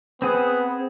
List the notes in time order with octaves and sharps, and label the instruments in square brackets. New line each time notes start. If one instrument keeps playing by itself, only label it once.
[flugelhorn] B3 [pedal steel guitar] C4 G#4